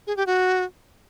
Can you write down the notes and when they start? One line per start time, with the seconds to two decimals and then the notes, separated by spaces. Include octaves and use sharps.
0.07 G#4
0.17 G4
0.27 F#4